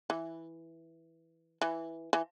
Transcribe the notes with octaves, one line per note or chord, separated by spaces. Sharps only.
E3
E3
E3